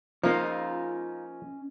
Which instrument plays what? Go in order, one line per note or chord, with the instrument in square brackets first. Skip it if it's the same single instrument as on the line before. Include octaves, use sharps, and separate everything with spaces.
[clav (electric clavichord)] F3 A#3 [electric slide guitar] C#4 D#5 [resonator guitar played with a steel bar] D#4 F4